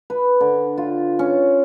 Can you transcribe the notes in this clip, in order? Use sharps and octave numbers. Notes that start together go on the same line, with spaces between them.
B4
D3
F4
C#4